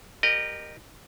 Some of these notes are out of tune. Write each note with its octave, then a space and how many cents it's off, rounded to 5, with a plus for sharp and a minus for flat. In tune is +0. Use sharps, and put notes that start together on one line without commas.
G4 +0 A#4 +0 D#5 -30